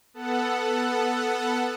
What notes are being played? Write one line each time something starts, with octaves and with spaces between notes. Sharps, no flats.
B3 A4 F#5